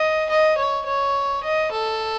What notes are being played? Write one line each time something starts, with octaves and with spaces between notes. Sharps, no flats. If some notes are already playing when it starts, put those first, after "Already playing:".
Already playing: D#5
D#5
C#5
C#5
D#5
A4